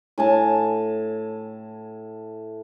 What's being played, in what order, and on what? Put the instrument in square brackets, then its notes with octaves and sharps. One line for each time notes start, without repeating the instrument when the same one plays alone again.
[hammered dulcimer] A2 G#5 A5